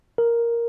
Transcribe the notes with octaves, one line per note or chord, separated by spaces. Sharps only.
A#4